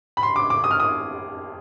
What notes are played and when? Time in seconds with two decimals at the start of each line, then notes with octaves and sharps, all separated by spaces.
0.17 B5
0.23 C6
0.36 D6
0.50 D6
0.64 D#6
0.71 F6
0.80 D#6